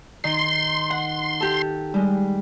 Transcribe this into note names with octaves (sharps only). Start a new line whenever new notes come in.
D#3 C6
F#5
G4 A4
G3 G#3